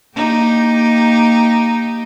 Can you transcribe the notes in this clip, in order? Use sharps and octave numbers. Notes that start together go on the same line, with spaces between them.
A#3 D#4 G4